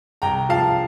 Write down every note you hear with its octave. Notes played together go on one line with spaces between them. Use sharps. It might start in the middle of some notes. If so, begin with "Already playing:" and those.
C2 G5 A#5
F3 F5 A5